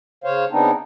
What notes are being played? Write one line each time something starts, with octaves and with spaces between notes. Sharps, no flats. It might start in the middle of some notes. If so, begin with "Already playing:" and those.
C#3 C5 C#5 F5
C#3 B3 C4 D4 D#4